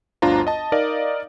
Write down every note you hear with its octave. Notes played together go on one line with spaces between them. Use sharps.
G1 D2 D4 F4 C5 A#5
D#5 A5
D#4 A#4 D5 D#5 F5